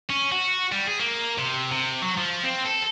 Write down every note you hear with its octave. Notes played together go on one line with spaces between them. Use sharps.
C#4
F#4
G3
G#4
A#3
C3
C3
F#3
F3
C4
A4